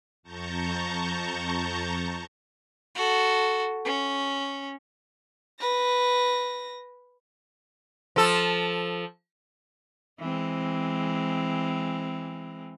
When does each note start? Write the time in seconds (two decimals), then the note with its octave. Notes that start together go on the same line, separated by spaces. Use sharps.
0.23 F2 A5 A#5 C#6 G6
2.95 F#4 A4
3.85 C#4
5.60 B4 A#6
8.16 F3 A4
10.19 E3 G#3 C4